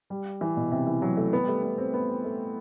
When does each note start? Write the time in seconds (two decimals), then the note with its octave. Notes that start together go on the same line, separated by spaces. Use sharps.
0.10 G3
0.41 E3
0.57 B2
0.71 C3
0.87 E3
1.02 F#3
1.17 A3
1.33 B3
1.43 G3
1.48 A3
1.63 B3
1.78 C4
1.94 B3
2.25 A3